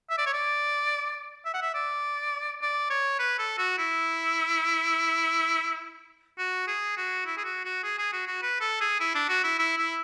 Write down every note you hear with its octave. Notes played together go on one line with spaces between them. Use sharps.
E5
D5
C#5
D5
E5
F#5
E5
D5
D5
C#5
B4
A4
F#4
E4
F#4
G#4
F#4
E4
G#4
F#4
F#4
G#4
G#4
F#4
F#4
B4
A4
G#4
E4
D4
F#4
E4
E4
E4